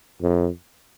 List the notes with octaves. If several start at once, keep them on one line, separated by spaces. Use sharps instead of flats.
F2